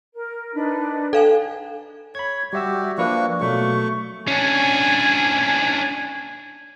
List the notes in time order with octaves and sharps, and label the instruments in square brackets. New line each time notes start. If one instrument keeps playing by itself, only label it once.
[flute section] A#4
D4 D#4 B4
[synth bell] A4 F5 G#5
[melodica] C#5 [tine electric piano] B5 G#6
[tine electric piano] G3 E5 E6 [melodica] F#4 G4
[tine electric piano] F3 B4 [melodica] A#3 D4 C#6
[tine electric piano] B2 F#3 [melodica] A3 C#6
[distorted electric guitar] C#4 D4 [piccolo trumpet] G#5